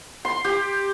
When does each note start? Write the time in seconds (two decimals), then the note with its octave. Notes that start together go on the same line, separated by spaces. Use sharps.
0.25 C6
0.45 G4